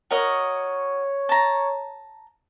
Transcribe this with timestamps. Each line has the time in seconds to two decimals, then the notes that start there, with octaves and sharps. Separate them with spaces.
0.11 F#4 A#4 C#5 D#5
1.29 A5 A#5